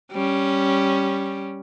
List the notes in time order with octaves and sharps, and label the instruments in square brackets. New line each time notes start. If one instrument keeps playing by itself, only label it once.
[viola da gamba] G3 C#4